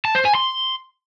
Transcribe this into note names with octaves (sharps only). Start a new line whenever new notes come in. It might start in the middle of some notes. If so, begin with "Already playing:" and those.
A5
C5
G#5
C6